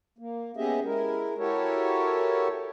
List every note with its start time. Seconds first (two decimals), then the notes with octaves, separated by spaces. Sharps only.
0.18 A#3
0.57 B3 C#4 G4 G#4 D#5 E5
0.84 G#3 E4 A#4
1.38 E4 F#4 G4 A4 A#4 C#5